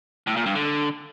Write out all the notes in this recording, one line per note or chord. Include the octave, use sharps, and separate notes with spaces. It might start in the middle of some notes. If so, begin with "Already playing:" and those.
A2
A#2
G2
D3